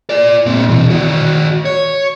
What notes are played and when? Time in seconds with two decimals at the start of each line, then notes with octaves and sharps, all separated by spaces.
0.10 F4 D5
0.46 A#2 C4
0.69 B2 E3
0.90 D#3 F#4
1.65 C#5